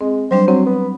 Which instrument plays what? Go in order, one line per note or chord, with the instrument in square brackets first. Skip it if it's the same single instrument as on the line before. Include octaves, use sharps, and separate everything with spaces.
[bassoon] G#3 [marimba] C4
[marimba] F#3 G3 D4 [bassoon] C5
[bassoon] F#3 [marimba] C4
[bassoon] B3